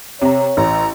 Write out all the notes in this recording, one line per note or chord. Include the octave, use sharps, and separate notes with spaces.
C3 C#5 A#5
A1 A#5